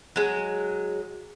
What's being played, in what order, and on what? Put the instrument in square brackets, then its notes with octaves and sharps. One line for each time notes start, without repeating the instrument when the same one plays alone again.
[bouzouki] F#3 G#3